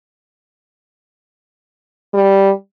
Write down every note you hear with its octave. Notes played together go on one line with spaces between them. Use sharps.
G3